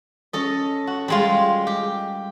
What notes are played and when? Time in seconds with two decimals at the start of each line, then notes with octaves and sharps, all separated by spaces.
0.33 C#4 A4 D#5
0.87 F#4
1.08 G3 G#3 F4
1.67 G4